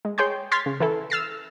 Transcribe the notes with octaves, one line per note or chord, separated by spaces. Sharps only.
G#3
G#4 C#5 G5 C6 G6
C6 F6 G#6 A6 B6
C#3
E3 E4 A4
E6 F6 A6 C7